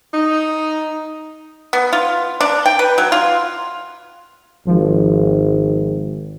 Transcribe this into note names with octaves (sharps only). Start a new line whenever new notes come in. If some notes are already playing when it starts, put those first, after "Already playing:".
D#4
B3
F4
D4
G5
B4
F#3
F4
G#1 F3